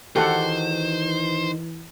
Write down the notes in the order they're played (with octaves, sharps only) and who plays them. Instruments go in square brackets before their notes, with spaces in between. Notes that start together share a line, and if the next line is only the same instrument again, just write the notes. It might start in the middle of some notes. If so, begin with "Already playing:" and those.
[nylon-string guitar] D#3 F#4 [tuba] E3 [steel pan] G4 A4 F#5 [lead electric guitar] C5